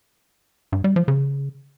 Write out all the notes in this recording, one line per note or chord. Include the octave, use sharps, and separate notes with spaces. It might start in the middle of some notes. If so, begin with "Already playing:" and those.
G2
G3
F3
C#3